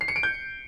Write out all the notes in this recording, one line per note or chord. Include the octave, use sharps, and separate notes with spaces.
C7
C#7
D7
G6